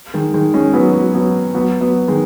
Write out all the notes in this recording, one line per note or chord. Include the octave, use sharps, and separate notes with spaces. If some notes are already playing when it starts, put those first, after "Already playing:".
D#3 G#3
D#3 G#3
G#3 C#4
F#3 B3
F#3
F#3 B3
F#3 B3
F#3 B3
D#3 G#3